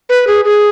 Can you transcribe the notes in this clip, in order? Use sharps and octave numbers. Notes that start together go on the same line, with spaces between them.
B4
G#4
G#4